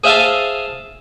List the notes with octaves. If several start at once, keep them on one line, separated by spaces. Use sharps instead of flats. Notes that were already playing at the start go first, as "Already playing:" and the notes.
G#4 C5 E5 F5 G#5 A5